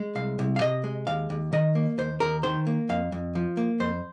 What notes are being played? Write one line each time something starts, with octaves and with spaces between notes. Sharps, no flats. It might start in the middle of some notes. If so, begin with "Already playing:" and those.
Already playing: G#3
C2 F5
C2
F5
C3 D#5
G#3
D#2 F5
D#2
D#3 D#5
A#3
D#2 C5
D#2 A#4
D#3 C5
A#3
F2 F5
F2
F3
A#3
F2 C5